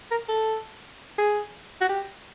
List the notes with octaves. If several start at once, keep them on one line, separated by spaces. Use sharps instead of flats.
A#4
A4
G#4
F#4
G4